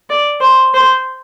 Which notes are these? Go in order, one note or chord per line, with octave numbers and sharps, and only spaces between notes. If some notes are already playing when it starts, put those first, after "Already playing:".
D5
C5
C5